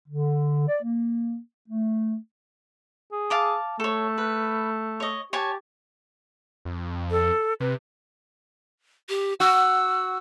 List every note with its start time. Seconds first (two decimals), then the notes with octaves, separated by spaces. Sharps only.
0.09 D3
0.69 D5
0.83 A#3
1.69 A3
3.12 G#4
3.30 F5 A5 D6
3.80 A3 A4 C#5
4.18 B4
5.00 C#5 D#5
5.33 G4 C#5 G#5 A5
6.65 F2
7.11 A4
7.60 C3 B4
9.09 G4
9.40 F#4 E6